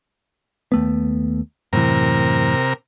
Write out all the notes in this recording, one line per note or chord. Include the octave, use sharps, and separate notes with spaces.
D#2 A3 B3
F#2 A2 C3 E3 A#4